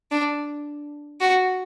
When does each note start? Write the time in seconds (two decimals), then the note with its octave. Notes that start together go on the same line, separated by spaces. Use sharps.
0.11 D4
1.21 F#4